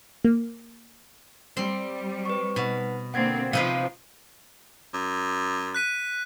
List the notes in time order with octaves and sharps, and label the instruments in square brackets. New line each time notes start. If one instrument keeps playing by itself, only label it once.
[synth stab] A#3
[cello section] G3 [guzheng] C4 C6
[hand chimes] B4 C#6
[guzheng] B2 [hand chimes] D#4 B4 F#5
[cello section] D3 A#3 C4 [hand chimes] F#5 G#6 A6
[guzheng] C3 D#4 B4 [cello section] F3 [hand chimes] F5
[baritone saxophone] F#2
[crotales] F#6 B6 D#7